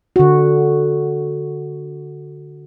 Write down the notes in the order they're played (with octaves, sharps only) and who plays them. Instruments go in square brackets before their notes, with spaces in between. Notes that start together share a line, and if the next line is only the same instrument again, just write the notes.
[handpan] D3 F#4